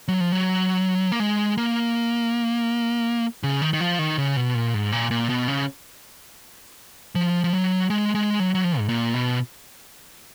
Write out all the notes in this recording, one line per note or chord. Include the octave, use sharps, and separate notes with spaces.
F#3
F3
F#3
A#3
G#3
A#3
C#3
D#3
D#3
F3
D#3
C#3
B2
A#2
G#2
A#2
A#2
B2
C#3
F3
F3
F#3
G#3
G#3
F#3
F#3
F3
G#2
A#2
B2